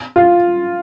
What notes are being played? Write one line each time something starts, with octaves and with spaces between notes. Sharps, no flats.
F4